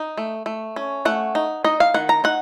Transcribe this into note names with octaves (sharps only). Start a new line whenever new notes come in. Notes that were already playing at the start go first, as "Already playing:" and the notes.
Already playing: D#4
A3
A3
C#4
A3 F#5
D#4
D#4 D#5
F5
D#3 F#5
A#5
D#4 F#5